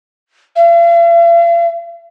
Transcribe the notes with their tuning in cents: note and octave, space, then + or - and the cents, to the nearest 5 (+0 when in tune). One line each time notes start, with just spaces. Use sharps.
F5 -45